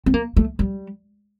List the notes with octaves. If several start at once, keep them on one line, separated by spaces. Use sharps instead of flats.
C4
A#3
A3
G3